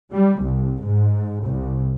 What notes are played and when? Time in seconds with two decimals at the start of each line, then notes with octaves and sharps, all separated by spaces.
0.12 G3
0.41 C2
0.82 G#2
1.43 C2